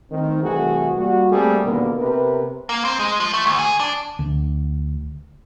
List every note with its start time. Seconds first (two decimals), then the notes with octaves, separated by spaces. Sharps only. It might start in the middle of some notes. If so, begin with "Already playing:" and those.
0.11 D#3 A3 C4
0.42 C2 E3 A3 F#4 G#4
0.97 G3 A#3 F#4
1.31 G3 A3 A#3 C4 G#4 A4
1.64 D#2 B2 D3 A#3 B3 A#4
1.99 C3 B3 A#4 B4
2.69 A#3
2.85 C4
2.99 G#3
3.20 F3
3.34 A3
3.46 D2
3.59 G#4
3.80 D4
4.19 D2